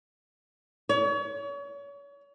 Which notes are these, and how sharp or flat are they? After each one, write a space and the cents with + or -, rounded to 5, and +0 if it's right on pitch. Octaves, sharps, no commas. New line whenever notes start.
C#5 +35